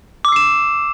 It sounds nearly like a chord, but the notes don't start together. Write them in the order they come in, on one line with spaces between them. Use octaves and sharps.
D6 E6 C7 E7